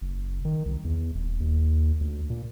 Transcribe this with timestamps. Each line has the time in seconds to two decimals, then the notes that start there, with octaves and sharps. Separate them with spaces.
0.01 F#1
0.45 D#3
0.65 C2
0.84 E2
1.15 D#1
1.40 D#2
2.01 D2
2.30 A#2